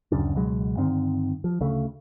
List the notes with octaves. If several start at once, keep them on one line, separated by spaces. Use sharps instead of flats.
D1 F#2 C#3 D4
C#2 B2 F#3 G#3
G2 D3 D#3 C4
F3
D2 C#3 A3